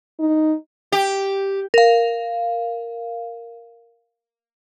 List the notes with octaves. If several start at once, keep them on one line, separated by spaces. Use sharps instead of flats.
D#4
G4
A#4 F5